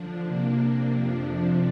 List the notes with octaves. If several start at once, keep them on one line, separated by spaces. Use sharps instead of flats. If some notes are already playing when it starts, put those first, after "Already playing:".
Already playing: D3 F3 D4
C3 A#3 D4
F2 C3 F3 D4